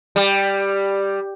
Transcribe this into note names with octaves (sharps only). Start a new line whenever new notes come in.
G3